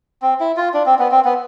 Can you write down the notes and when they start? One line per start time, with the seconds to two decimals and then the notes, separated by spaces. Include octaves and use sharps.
0.22 C4
0.40 E4
0.57 F4
0.74 D4
0.86 C4
0.99 B3
1.11 C4
1.25 B3